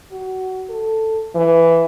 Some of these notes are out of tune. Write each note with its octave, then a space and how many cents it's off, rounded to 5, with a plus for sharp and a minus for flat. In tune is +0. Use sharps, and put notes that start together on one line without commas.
F#4 +20
A4 +10
E3 +10